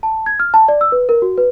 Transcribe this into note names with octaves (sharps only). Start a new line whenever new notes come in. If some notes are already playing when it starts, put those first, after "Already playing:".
A5
G#6
F6
A5
D5
E6
B4
A#4
F#4
B4